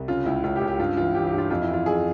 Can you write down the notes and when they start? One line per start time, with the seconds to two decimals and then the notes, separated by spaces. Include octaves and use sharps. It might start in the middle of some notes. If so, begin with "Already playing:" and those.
Already playing: C2
0.08 C#3 F4
0.25 C#2 E4
0.43 C#2 F4
0.56 G4
0.61 C#2
0.68 G4
0.79 G2 F4
0.97 E3 F4
1.15 E3 G4
1.27 G4
1.33 G2
1.38 F4
1.50 F2 F4
1.61 E4
1.69 E3 F4
1.86 F2 G#4